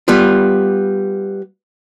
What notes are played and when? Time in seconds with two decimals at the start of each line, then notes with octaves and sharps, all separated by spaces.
0.08 G3 B3 F4